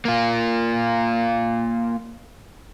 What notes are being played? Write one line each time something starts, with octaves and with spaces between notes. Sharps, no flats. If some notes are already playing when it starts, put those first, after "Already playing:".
A#3 F4